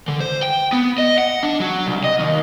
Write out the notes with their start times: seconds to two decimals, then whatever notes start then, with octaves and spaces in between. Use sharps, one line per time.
0.08 D3
0.20 C5
0.43 G5
0.72 B3
0.98 D#5
1.18 F#5
1.43 D4
1.60 F#3
1.86 C2
2.04 D#5
2.19 D#2